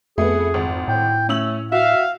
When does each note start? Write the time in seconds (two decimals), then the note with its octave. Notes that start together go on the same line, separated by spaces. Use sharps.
0.18 F2 A3 B3 G#4
0.54 G#1
0.88 A2 G5
1.29 A3 C#4 E6 F#7
1.72 F#4 E5 F5